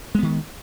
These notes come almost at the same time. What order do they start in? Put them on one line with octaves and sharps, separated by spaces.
G#3 B3 D#3